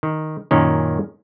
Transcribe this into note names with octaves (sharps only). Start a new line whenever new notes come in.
D#3
F#2 A#2 D#3 C#4